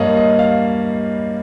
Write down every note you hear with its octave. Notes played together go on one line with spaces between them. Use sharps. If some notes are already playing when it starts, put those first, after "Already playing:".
Already playing: G2 G3 A#3 C#5 D#5 F5
D#5
F5